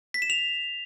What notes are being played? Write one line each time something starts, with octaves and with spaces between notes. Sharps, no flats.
B6
E7
F7